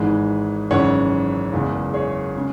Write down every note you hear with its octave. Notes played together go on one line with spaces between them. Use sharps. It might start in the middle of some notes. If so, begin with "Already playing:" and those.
Already playing: G#1 G#2 E3 G#3
G#1 F#2 C#3 E3 G#3 C#5 F#5
F#1 E2 E3 G#3
G#4 C#5
C#3 G#3